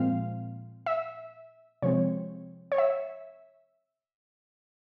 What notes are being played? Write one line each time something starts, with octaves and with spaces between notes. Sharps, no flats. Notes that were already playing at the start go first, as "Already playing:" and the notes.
Already playing: A#2 F3 G#3 C4 F5
E5
C3 F3 G#3 C4 C#5
C#5
E5